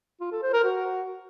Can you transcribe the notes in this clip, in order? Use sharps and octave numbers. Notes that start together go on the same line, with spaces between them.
F4
A4
C5
A#4
F#4